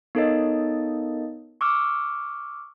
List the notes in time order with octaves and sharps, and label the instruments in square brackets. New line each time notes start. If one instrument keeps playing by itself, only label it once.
[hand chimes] B3 D#4 A4 A#4 C#5 D#5
C#6 D6 E6 F6